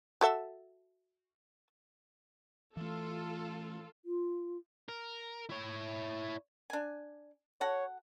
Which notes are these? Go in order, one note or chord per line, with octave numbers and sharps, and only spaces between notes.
F#4 A4 E5
E3 A3 F4 A4
F4
A#4
E4 C#5
D4 G#5
F#4 A4 C#5 F#5